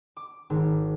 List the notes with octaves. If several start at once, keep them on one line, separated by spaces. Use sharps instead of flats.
D6
G#1